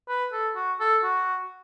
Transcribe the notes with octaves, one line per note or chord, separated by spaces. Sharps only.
B4
A4
F#4
A4
F#4